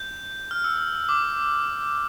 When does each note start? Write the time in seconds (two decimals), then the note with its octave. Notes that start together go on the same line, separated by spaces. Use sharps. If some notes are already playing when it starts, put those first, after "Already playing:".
Already playing: G6
0.51 F6
0.64 E6
0.77 F6
1.09 D6